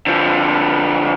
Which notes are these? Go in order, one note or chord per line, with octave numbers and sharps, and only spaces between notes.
D3 F3